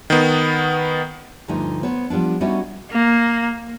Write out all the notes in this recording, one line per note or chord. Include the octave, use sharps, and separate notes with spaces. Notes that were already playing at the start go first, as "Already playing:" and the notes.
D#3 B3
D2 G2 D3 F3 A3 D#4
B3 C5 C#5
F3 G3 B3 D4
G3 B3 C#4 D#4 E4 F#4
A#3